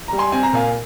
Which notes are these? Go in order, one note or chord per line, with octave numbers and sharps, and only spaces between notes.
G3 A#5
G#5 C6
C4 G#5
A#5
A#2 F5 G#5